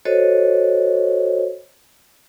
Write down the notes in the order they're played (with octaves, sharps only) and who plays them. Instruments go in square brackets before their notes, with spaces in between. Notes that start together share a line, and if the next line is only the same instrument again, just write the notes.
[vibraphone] F#4 A4 C5 C#5 D#5